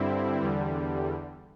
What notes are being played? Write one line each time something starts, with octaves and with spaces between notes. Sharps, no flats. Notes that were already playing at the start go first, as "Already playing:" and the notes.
Already playing: G2 D3 G3 C4 E4
E2 D3 G3